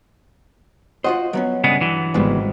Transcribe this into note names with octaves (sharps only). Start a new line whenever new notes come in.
F4 F#4 C5 D#5 F#5
F#3 B3 C#4
G2 C#3 G#3 B3
E3 F#3
G#1 C#3 G3 G#3 B3